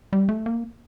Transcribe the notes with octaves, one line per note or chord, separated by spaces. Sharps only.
G3
A3
A#3